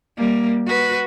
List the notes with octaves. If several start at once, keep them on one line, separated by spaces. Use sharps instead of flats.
G3 A#3
F#4 B4